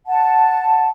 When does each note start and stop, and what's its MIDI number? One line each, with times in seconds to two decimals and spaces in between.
0.07 0.89 78
0.07 0.89 81